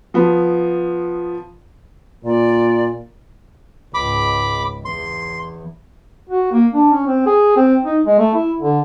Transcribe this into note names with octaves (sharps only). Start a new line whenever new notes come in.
F3 B3
A#2 D5
C#2 G#2 B5 D6
E2 C6
F#4
A#3
D4
C#4
C4
G#4
C4
D#4
G#3
A3
E4
D3